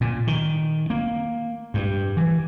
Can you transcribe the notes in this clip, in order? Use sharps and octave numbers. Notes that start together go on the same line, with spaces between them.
A#2
D#3
A#3
G2
E3